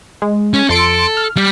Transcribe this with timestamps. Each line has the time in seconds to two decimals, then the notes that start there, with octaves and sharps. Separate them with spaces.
0.22 G#3
0.54 C#4
0.69 F2 A4 C6 D7
1.17 F6
1.37 G3